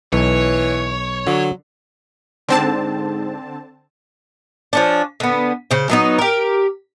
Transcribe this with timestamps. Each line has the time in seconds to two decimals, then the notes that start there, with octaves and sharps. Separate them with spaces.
0.13 B1 E3 C#5
1.27 D3 F#3
2.49 G#2 D3 C4 A5
4.73 F3 C#4 D4
5.20 D3 B3
5.71 C#3 C5
5.90 F#3 B3 D#4
6.19 G4 A#4